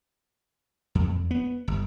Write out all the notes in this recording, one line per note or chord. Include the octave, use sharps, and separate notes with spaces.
F2
B3
G1